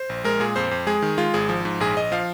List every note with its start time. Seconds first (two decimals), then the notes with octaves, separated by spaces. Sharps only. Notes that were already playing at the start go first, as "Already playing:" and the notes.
Already playing: C5
0.09 A#1
0.24 G#3 A#4
0.40 A#2 G#4
0.56 F2 C5
0.71 F2
0.87 G#3 G#4
1.02 D#3
1.18 G#3 F4
1.34 G#1 G#4
1.49 F3
1.65 G#2
1.80 A#1 G#4
1.96 A#1 D#5
2.12 F3 F5